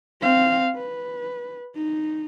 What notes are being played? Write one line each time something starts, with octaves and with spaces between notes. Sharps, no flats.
C4 F5
B4
D#4